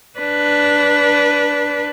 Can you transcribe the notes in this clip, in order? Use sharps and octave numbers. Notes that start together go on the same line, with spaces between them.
D4 B4